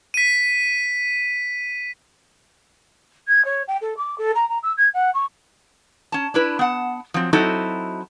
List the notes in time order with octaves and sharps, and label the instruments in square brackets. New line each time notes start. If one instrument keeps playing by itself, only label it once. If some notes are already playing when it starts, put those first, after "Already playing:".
[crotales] B6 D#7
[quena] G#6
C#5
G5
A4
D6
A4
A#5
A#5
E6
G#6
F#5
C#6
[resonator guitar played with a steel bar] C#4 A5
D4 E4 B4
B3 F#5 A5
F3 F#3 C4
F#3 C4 D#4 E4 F#4 A4